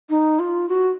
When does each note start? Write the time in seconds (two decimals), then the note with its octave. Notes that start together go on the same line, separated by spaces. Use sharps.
0.09 D#4
0.39 F4
0.68 F#4